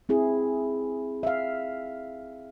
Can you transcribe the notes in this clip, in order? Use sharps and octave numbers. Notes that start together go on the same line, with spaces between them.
C4 E4 G#4
E5 F5